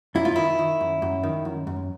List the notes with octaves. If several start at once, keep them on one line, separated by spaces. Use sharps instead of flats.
F#2 E4
F4
D#3 E4
D#3
F#2
F#2
D#3
F#2
F#2